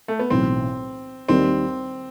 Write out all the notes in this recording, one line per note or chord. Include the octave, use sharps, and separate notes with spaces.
A3
B3
B1 A2 E3 C4
D#2 D#3 G3 C4 D#4